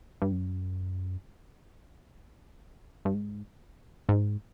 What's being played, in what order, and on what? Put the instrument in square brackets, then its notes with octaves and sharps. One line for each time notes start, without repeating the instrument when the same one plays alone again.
[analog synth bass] G2
F#2
G2
G#2
G#2